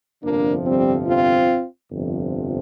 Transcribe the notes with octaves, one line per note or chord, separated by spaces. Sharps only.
G1 F2 C3 F3 A#3 D4
G3 C4
C4 F4
G1 F2 C3 F3